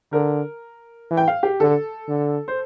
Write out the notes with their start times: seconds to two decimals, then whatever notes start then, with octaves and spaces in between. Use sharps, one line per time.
0.12 D3 A#4
1.11 E3
1.17 G5
1.28 F5
1.43 G4
1.60 D3 A4
2.08 D3
2.48 C5